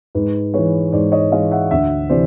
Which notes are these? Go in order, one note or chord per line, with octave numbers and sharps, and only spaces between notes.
G#2 B4
E3 G#3 B4 C#5
G#2 C5 D5
C#5 D#5
E3 G#3 D#5 F5
E5 F#5
D2 E5 F#5
C3 E3 C5 D5